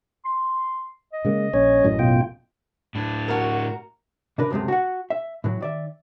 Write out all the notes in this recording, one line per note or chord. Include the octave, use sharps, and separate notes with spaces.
C6
D#5
C#3 G#3 A#3
A#1 C#4 C#5
A1 F#2 A2
B2 F4 G5
A2 D4
F#4 A#4
C3 D4 A#4 B4
C#2 F#2 C3 G#3 A3
F#4 F#5
E5
A2 E3 F#3
D#3 D5 E5